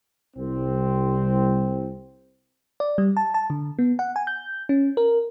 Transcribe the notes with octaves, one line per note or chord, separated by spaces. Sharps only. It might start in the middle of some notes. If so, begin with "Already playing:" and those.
C2 C4
D5
G3
A5
A5
D3
B3
F#5
G#5
G6
C#4
A#4